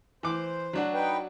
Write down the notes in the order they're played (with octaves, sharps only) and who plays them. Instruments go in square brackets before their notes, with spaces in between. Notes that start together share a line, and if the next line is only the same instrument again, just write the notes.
[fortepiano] E3 D6 [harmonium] C5
[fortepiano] F#3 D4 F#4
[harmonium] D#4 B4 G5